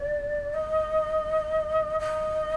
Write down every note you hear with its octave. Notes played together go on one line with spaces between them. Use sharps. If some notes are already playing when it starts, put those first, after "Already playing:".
Already playing: D5
D#5
D#5